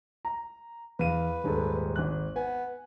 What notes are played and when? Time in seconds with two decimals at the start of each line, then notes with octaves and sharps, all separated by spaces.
0.25 A#5
0.99 E2 B4 F5 D#7
1.44 D#1 G#2 A4
1.96 G#1 F#6
2.36 B3 G#5